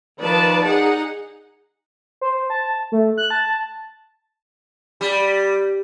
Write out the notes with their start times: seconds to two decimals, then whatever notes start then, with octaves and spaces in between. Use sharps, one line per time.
0.20 D#3 F3 B4 D5 A5
0.67 D#4 G#4 F#5
2.21 C5
2.50 A5
2.92 A3
3.18 F#6
3.30 A5
5.01 G3